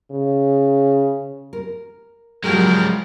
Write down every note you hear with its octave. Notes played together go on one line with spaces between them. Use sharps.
C#3
A#4
F3 F#3 G#3 F#4 G4 A#4